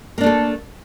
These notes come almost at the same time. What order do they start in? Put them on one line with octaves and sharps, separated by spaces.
A#3 D4 A3 A4